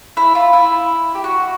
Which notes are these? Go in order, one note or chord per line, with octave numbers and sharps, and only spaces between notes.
E4
F4
E4
G4
F#4